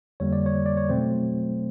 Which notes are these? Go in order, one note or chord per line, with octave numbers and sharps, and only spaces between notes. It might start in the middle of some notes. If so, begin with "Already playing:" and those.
F2 D3 G3 A#3 C#5
D5
C#5
D5
C#5
B2 F#3 A3 C4 C5